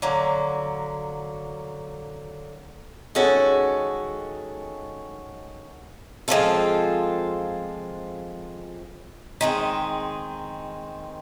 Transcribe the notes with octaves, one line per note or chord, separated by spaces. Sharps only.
D3 F#3 A#3
D#3 G#3 C#4 F#4 A4
F3 G#3 C4 F4 A4
D#3 G#3 C4